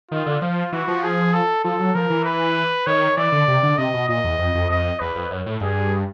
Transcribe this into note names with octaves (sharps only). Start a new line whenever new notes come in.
D#3 F4
D3
F3 F4
E3 F#4
F3
G#4
A4
F3 A4
F#3
F3 A#4
E3
B4
D#3 C#5
E3 D5
D3
C3
D3
C3 D#5
B2
A#2 D#5
E2
F2
F2
F2 D#5
E2 B4
F2
F#2
A2
G2 G#4